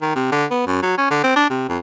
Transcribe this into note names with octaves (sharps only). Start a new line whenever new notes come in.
D#3
C3
D3
B3
F#2
F#3
C#4
D3
C4
D4
C3
F2